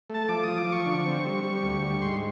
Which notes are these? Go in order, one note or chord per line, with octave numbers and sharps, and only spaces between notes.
A3 A5
F3 D6
F3 D#6
D6
F3
C#6
D3
C4
G3
G3
D2
G3
G#2 C6